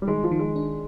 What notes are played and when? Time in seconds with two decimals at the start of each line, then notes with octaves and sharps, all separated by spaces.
0.02 G3
0.08 D#3 G#3
0.24 F3
0.31 D#3
0.39 G#3
0.56 D4